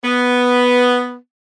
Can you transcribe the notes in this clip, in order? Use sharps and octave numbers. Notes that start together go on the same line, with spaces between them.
B3